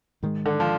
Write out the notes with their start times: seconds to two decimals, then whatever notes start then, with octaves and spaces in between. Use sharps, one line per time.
0.23 G#2 D#3 G#3
0.46 D3
0.60 F3